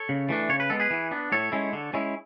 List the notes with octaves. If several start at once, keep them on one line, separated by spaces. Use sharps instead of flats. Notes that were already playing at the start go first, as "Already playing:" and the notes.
Already playing: A4 C#5
C#3
E3 A3 D4
C#3 C#5
B4
G#3 B3 A4
G#4 B4
E3
B3 D4
A2 A4 C#5
G#3 C#4 E4
D3
G#3 C#4 E4